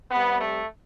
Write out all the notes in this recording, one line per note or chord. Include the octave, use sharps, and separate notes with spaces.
C3 G3 B3
A3